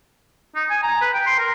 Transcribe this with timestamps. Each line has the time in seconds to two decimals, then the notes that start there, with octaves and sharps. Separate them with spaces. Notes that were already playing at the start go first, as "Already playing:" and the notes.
0.56 D#4
0.70 G#5
0.83 A#5
1.02 B4
1.14 G5
1.26 C6
1.39 A#4